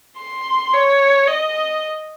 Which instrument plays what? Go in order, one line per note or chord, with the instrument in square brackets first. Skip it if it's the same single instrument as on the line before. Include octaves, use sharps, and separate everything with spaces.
[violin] C6
C#5
D#5